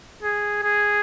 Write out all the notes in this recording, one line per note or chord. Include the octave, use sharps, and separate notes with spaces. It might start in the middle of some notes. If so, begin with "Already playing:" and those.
G#4
G#4